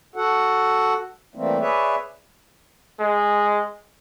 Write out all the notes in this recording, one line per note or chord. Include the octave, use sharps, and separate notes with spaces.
F#4 A4 F#5
E3 G3 A3 A#3 C4
G#4 B4 C#5 D5 E5
G#3